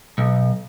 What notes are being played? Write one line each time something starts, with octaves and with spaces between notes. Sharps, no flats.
B1